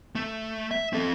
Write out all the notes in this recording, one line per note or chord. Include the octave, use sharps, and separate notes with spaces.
A3
E5
C4 A4